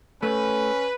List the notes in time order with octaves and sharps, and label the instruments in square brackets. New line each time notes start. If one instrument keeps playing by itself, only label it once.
[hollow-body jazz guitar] A3 [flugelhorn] C#4 [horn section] B4